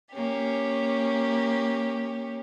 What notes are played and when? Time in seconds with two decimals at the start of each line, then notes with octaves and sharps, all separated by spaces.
0.13 A#3 C#4 G4